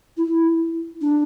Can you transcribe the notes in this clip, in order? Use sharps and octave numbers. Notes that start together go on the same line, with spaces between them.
E4
D4